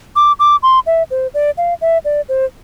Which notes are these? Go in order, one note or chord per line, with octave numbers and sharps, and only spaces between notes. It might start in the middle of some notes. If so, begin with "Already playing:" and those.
D6
D6
C6
E5
C5
D5
F5
E5
D5
C5